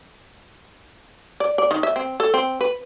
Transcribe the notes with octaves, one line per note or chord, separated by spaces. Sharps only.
D5
D5
D#3
E5
C4
A4
C4
B4